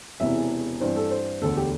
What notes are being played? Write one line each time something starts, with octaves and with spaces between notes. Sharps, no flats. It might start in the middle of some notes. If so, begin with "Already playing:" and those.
E1 E2 C3 E3 E5
G2 E3 C4 C5
A4
C5
E1 D2 D3 A4
G4